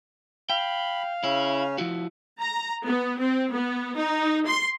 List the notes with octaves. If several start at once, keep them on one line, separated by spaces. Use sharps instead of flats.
F5 G5 B5
C#3 C#4 E4
F3 E4 F#4
A#5
B3
C4
B3
D#4
C6